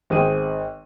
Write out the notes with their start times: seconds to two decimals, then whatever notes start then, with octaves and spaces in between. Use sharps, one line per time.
0.10 G#1 C4 G#4 G5 D#7